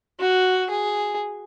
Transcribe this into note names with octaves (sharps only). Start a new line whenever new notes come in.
F#4
G#4